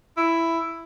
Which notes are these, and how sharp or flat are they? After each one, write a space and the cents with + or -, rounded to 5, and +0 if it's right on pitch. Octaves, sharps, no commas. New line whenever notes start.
E4 +5